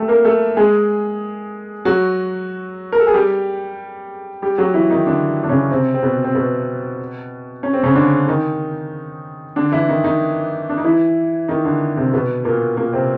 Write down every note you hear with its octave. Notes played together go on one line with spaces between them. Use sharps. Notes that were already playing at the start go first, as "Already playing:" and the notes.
Already playing: G3 A3 A4
A#3 A#4
A3 A4
G#3 G#4
F#3 F#4
A#4
A4
G#4
G3 G4
G3 G4
F#3 F#4
E3 E4
D#3 D#4
D3 D4
D4
C#3 C#4
C3 C4
C4
B2 B3
C4
B2 B3
C#4
C4
C#3 C#4
D3 D4
D#3 D#4
D3 D4
E3 E4
D#3 D#4
D#3 D#4
D4
D#4
E3 E4
D#3 D#4
D3 D4
C3 C4
B2 B3
A#2 A#3
A#2 A#3
C3 C4